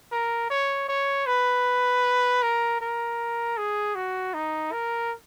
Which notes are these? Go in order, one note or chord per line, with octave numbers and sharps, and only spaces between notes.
A#4
C#5
C#5
B4
A#4
A#4
G#4
F#4
D#4
A#4